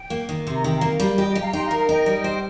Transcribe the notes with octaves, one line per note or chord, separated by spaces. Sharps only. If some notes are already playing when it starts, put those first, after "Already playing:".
Already playing: G5
A#3
D#3
C3 C6
A#5
D#3 G5
F5 A#5
A#3
G3
G4 D#5 G5
D#5 G5
G4
F5 A#5
D#4 G5 C6
F5 A#5
A#4
F5 A#5
D#4 D#5 G5
G3
C5